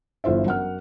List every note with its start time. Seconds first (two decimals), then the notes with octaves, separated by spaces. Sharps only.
0.24 G1 E3 F4 C5 E5
0.46 F#2 F#5 F6